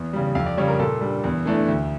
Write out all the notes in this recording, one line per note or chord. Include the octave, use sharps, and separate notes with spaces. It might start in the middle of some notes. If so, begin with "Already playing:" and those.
Already playing: E2
C#3 G3
F2 F5
D5
C#3 G3 C#5
A#4
A#2 A4
G3 D4
E2
E3 A3 D4
D2